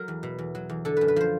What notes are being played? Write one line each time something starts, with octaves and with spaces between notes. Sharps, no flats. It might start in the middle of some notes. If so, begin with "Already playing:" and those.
Already playing: F#3 A#4
E2
B2
E2
F#3
E2
D3 A4
F#2 B4
B4
F3 C5